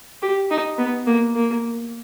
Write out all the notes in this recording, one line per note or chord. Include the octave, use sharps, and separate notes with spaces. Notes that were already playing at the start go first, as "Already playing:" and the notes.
G4
D#4
B3
A#3
A#3